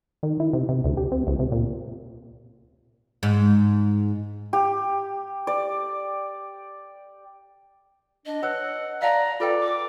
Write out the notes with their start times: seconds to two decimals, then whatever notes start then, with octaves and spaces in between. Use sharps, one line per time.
0.23 D#3
0.40 E4
0.53 C3
0.69 C3
0.84 D2
0.97 G4
1.12 C4
1.27 C#2
1.39 C3
1.52 A#2
3.23 G#2
4.53 G4
5.47 D5
8.26 D4 D#5
8.43 B4 C#5 F#5 E6
9.02 D5 F5 F#5 A5 A#5
9.40 F4 A4 B4 D5 G5
9.61 D6